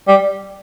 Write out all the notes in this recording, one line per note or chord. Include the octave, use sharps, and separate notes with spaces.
G3